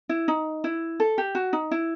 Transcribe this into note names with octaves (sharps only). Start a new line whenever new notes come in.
E4
D#4
E4
A4
G4
F#4
D#4
E4